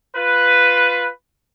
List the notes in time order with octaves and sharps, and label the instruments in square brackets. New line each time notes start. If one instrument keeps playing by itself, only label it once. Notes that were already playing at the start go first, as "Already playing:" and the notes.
[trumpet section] F4 B4